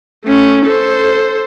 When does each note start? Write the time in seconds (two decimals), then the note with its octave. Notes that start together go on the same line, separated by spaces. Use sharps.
0.25 A3 C#4
0.65 A4 C5